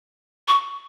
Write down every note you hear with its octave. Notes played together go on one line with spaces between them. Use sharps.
C#6